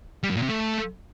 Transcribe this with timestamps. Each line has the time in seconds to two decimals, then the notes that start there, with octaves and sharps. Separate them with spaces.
0.23 G3
0.30 F#2
0.36 A#2
0.43 C3
0.49 A3